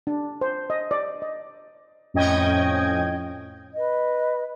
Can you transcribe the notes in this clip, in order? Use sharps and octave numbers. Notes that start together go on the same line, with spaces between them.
D4
C5
D#5
D5
D#5
F2 A2 C#4 D#5 G5 G#6
B4 D#5